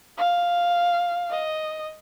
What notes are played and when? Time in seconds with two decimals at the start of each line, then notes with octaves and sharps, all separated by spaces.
0.18 F5
1.30 D#5